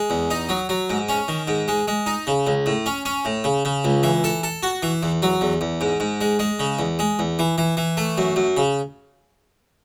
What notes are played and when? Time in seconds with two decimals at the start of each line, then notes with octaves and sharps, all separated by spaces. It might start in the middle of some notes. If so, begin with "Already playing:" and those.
Already playing: G#3
0.10 E2
0.31 D#4
0.49 F#3
0.69 F#3
0.90 G#2
1.09 C#4
1.28 D#3
1.48 G#2
1.68 G#3
1.88 G#3
2.06 D#4
2.27 C#3
2.47 C#2
2.66 A2
2.86 C#4
3.05 C#4
3.25 A2
3.44 C#3
3.65 C#3
3.85 C#2
4.03 E3
4.24 A4
4.43 A4
4.63 F#4
4.83 E3
5.03 E2
5.22 F#3
5.41 E2
5.61 E2
5.81 G#2
6.00 G#2
6.21 G#3
6.39 G#3
6.59 C#3
6.79 E2
6.99 G#3
7.19 E2
7.39 E3
7.58 E3
7.77 E3
7.97 A3
8.18 F#2
8.36 F#2
8.57 C#3